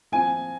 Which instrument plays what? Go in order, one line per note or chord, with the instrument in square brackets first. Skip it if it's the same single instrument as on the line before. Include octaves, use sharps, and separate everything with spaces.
[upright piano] F3 C4 G#5